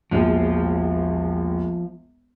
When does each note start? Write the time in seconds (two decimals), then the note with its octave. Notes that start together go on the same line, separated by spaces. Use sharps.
0.11 E1 A#1 F3